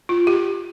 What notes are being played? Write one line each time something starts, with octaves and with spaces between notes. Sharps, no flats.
F4
G4